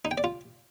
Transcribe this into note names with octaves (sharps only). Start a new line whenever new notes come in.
D#4
G5
D5
F4